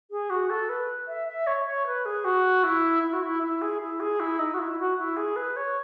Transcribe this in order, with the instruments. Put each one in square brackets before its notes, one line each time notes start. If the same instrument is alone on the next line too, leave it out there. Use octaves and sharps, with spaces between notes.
[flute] G#4
F#4
A4
B4
E5
E5
C#5
C#5
B4
G#4
F#4
E4
E4
F#4
E4
E4
G#4
E4
G#4
E4
D#4
F#4
E4
F#4
E4
G#4
B4
C#5